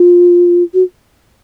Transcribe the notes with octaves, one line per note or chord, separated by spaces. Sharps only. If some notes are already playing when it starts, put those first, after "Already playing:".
Already playing: F4
F#4